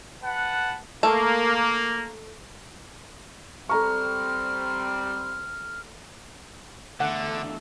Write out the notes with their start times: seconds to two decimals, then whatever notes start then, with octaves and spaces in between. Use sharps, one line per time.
0.23 B4 F#5 A5
1.03 A3 A#3
3.69 G3 C4 A4 A#5 C#6 F6
7.00 E2 D3 A3 D4 F#5